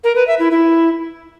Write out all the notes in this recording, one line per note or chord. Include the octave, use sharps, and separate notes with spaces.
A#4
B4
E5
E4
E4